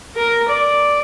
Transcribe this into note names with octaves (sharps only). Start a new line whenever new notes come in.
A#4
D5